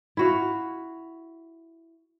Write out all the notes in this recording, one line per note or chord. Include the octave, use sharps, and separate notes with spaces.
E4 F#4 F5